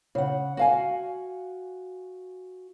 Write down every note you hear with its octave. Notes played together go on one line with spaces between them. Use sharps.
C#3 F#5
F#4 F5 G#5